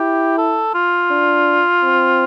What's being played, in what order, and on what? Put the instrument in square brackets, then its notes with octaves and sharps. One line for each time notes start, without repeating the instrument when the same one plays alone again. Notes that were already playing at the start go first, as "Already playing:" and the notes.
Already playing: [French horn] E4 [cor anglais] G4
[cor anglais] A4
F4
[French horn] D4
C4